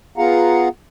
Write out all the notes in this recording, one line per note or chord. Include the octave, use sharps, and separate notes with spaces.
B3 F4 G#4 F5 F#5 A#5